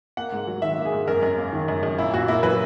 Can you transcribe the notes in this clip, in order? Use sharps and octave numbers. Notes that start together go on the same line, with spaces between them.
A#3 F#5
G#2
F#3
D#3 E5
A#3
G#4
G#2
F#2 A#4
F#2
A#3
D#3
F#2
F#2
A#2 E4
A#2 F#4
A#3 E4
F#3 B4